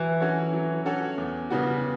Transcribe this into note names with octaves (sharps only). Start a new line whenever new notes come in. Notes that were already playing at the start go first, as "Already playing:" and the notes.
Already playing: E3 F#3
C#4 F#4 A4 C#5
F#3
C#4 F#4 A4 C#5
E2
C#3 G3 B3 F#4